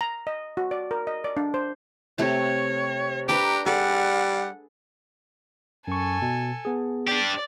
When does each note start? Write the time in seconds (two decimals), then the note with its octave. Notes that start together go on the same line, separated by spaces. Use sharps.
0.01 A#5
0.27 D#5
0.57 F#4
0.71 D5
0.91 A#4
1.07 D#5
1.24 D5
1.37 D4
1.54 C5
2.18 C3 A3 C#5 A5
3.29 D4 G4 B4 A#5
3.66 G3 G#4 A4 F#5
5.88 F#2 A4 G#5 C#6
6.22 B2
6.65 B3 G#4
7.08 D4 G4 D5